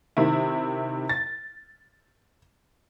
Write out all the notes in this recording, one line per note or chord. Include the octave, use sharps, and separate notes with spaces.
C3 D#3 E4
A6